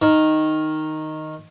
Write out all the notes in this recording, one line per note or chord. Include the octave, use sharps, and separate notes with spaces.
D#3